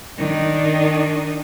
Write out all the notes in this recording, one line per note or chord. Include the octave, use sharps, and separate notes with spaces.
D#3 D4